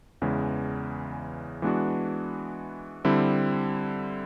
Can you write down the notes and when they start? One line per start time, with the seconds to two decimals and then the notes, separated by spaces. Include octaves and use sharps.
0.22 E2 C#3 E3 G#3
1.62 E3 G#3 B3 D4 F#4
3.05 D3 G3 C4 E4